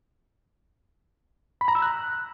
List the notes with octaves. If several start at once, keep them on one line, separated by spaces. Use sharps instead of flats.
B5
A#5
E6
F#6